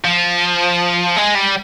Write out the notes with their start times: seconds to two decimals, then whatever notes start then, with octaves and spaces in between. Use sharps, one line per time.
0.04 F3
1.16 G#3
1.35 G3